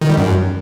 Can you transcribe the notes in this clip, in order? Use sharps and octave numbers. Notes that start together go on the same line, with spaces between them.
D#3
G3
F#2